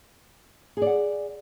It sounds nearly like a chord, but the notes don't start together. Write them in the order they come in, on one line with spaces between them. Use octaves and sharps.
G#4 D5 F#5